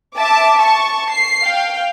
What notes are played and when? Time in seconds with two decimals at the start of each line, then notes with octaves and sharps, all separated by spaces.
0.16 E5 A5 D6
0.59 A5 C#6
1.12 C7
1.44 F5 G5